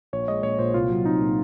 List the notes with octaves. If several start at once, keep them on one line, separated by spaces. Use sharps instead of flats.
A#1 C#5
G#3 D#5
A#1 C#5
A#2 C5
C2 F4
F#3
C4 D#4
A#2